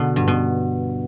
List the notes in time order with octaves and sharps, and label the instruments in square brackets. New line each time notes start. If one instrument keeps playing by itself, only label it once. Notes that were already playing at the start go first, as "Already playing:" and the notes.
Already playing: [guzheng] B2 D3
G2
B2